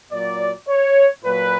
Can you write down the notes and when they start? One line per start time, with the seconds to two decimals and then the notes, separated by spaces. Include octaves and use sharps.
0.12 A#2 F#3 D5
0.68 C#5
1.24 A#2 F#3 B4